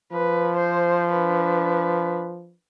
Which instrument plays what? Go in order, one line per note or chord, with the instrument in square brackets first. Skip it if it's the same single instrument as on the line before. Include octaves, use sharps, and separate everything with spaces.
[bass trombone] F3 [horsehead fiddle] B4
[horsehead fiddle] C5
D4 B4